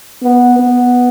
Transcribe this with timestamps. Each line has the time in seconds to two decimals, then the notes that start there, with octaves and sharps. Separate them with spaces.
0.22 B3
0.59 B3